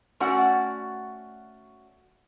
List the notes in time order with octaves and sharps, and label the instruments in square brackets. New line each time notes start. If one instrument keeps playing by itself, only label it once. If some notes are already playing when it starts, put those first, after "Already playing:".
[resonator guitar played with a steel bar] A3 C#4 F#4 D5 F#5